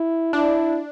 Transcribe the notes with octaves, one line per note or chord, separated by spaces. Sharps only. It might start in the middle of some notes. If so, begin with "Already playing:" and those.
Already playing: E4
D4 E4